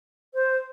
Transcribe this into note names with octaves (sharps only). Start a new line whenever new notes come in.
C5